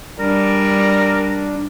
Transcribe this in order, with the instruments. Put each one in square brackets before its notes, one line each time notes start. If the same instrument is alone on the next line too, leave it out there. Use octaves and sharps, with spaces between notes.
[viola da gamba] G3 [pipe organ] D4 [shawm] A#4